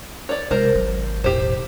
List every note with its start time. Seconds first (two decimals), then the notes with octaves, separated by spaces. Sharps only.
0.29 C#5 D5
0.51 C3 G#3 A#4 C5
0.75 G#1 F#3
1.24 E1 A2 D#3 G4 C5